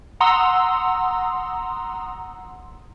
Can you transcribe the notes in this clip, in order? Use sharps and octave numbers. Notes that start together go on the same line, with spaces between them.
F#5 A#5 C6 D#6 E6